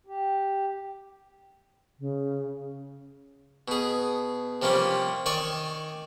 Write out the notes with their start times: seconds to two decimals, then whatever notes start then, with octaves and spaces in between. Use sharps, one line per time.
0.07 G4
1.99 C#3
3.68 B2 G#4
4.62 C3 F3 G3 A#3 C#4
5.26 D#3 C#5 D5 G#5